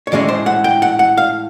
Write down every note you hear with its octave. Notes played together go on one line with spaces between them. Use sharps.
C#5
A2 E3 G#3 C#4 D5
C5
F#5
G5
F#5
F#5
F5